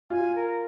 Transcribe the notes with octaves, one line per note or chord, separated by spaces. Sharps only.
F4 G#5
A#4